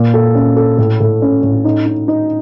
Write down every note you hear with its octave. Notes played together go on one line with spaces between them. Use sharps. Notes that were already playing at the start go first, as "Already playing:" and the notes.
Already playing: A#2 A#3
A4
C#4
A4
A2
A2
C#4
A2
D#4
D#4
D#4